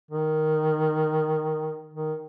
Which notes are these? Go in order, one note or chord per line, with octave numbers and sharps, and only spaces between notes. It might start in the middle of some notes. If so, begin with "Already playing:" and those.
D#3
D#3